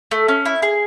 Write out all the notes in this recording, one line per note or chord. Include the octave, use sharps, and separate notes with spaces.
A3
C#4
E4
G#4